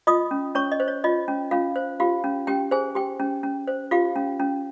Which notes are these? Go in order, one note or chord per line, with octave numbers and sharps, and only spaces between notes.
F4 D#5 D#6
C#4
C#4 C#5 C#6
D#5
C5
C#5
F4 D#5
C#4
C#4 F4 F5
C5
F4 G4 F5
C#4
C#4 G4 G5
G#4 C5 G#5
G4 G5
C#4
C#4
C5
F4 G4 F5
C#4
C#4